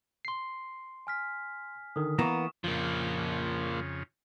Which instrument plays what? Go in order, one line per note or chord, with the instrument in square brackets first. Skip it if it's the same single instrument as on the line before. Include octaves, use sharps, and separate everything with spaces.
[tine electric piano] C6 C7
[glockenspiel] G#5 F6 B6
[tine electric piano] D3 D#3 [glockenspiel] D#6
[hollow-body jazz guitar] E3 A#3 B3 [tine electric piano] A#5 [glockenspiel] C#6 E7
[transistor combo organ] F2 C#3 [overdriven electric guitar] F3 A#3